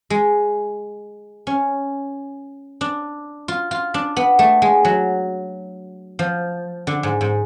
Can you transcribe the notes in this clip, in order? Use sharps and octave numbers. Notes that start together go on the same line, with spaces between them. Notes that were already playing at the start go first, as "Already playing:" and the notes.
G#3
C#4
D4
F4
F4
D4
B3
A3
G#3
F#3
F3
D3
G#2
G#2